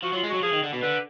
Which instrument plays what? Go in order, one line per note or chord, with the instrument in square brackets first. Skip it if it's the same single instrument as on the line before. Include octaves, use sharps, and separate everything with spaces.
[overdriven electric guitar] F3 [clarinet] F#4
[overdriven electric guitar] F#3
[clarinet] F4
[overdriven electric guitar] G#3
[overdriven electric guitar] F#3 [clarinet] F#4
[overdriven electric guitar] F3 [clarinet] G#4
[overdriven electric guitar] D#3
D3
B2
[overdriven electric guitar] D3 [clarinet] B4